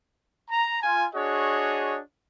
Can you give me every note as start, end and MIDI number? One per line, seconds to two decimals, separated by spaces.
0.49 0.78 82
0.82 1.05 65
0.82 1.05 80
1.14 1.99 62
1.14 1.99 66
1.14 1.99 68
1.14 1.99 73
1.14 1.99 75